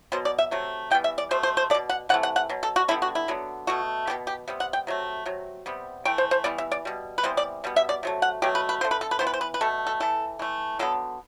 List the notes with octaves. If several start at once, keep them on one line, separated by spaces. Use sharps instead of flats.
B2 F#3 B3 C5
D5
E5
C3 F#3 A3
E3 G3 B3 G5
E5
D5
B2 A3 C5
C5
C5
A3 D5
B2
F#5
C3 E3 A3 F#5
F#5
F#5
B2 F#3
A4
F#4
D3 G3 B3 E4
F#4
E4
D3 F#3 B3
B2 A3 F#4
B2 F#3 B3 G4
G4
C3 G3 B3
F#5
G5
C3 F#3 A3
C3 F#3
C3 G3 B3
E3 A3 G5
C5
C5
E3 G3 B3 D5
E5
D5
B2 G3
B4
C3 E3 G3 B3 C5
D5
B2 G3 B3
E5
D5
C3 F#3 A3
F#5
B2 F#3 A3 G4
B4
B4
D3 A3 C5
B4
A4
B4
E3 B3 C5
B4
C5
B4
B4
B2 A3 A4
A4
E3 A3 A4
E3 A3
D3 F#3 B3 A4